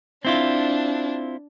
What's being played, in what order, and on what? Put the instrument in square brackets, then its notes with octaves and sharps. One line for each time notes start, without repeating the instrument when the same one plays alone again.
[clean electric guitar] C4 E4 F4 [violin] D4